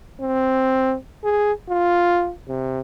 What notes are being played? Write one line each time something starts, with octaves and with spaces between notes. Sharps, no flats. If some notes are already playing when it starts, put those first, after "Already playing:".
C4
G#4
F4
C3